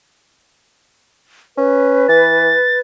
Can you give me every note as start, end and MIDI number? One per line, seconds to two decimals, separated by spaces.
1.57 2.08 61
1.57 2.80 71
2.08 2.53 52
2.08 2.79 93